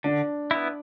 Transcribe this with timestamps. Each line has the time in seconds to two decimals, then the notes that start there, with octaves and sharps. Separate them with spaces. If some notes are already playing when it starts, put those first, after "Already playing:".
0.04 D3 D4
0.51 B3 E4